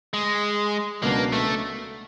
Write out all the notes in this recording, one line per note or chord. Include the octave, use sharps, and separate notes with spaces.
G#3
C#2 B2 F#3 A#3 B3 D4
A3